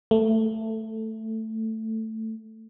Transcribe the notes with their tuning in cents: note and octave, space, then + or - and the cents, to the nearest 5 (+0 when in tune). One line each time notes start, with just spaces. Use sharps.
A3 +10